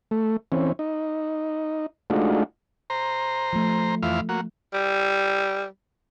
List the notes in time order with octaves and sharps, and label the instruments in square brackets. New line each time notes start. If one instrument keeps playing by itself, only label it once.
[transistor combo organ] A3
E3 C4 C#4
D#4
G#3 A3 D4 D#4 F4 F#4
C5 A#5
[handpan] F3 A3
[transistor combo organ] F2 E3 F5
A#3 F#4
[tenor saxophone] G3